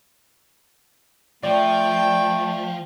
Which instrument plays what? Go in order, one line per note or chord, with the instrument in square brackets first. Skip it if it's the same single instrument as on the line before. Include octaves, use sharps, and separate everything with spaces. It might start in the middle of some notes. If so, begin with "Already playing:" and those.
[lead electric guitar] F3 [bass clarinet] A3 [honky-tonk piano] D5 [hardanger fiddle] G5